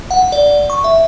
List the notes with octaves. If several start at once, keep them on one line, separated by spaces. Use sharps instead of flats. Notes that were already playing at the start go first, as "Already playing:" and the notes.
F#5
D5
C#6
E5